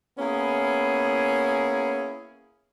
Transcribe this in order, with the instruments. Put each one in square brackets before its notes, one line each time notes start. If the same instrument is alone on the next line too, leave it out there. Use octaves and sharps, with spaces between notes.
[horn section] A#3 B3 C#4 E4 G#4